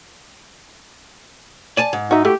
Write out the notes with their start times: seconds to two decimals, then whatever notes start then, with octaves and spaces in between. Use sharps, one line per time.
1.77 D5 G#5 A5
1.93 G#2
2.11 D#4 F#4 E5
2.25 A3 E4 F#4 G4